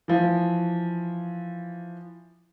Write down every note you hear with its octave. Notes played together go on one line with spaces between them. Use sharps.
E3 F3